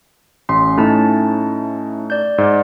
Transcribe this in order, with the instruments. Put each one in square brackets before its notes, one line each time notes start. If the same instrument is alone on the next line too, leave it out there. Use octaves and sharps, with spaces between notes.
[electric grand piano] A1 C6 [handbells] C#4
[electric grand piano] A2 A3 D#4 [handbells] C#4 E4 A5
[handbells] D5 G6
[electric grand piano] G#2 [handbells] D5